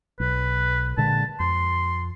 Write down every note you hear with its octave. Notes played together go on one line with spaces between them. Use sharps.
B1 B4
A#2 D3 G#3 A5
F2 C6